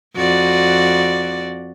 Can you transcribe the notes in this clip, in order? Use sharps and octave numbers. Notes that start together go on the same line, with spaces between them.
F2 F#4 D5